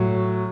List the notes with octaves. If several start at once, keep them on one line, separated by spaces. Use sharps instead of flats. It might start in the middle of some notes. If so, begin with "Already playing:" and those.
Already playing: A2 F#3